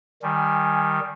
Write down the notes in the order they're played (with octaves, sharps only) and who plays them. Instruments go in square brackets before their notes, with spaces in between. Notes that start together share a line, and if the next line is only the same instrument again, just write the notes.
[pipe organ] D#3 G3 [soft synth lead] G#5